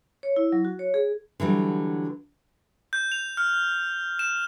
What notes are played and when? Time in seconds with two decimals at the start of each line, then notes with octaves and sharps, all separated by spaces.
0.23 C#5
0.36 E4
0.52 F#3
0.65 F#4
0.79 C#5
0.94 G#4
1.40 D3 E3 F#3 G3
2.93 G6
3.12 F7
3.37 F6
4.19 E7